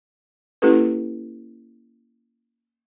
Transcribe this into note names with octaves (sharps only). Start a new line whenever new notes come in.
A#3 C#4 E4 G4 A4 B4